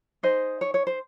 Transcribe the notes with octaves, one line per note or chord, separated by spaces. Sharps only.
D#4 G#4 C5 D#5
C#5
C#5
C5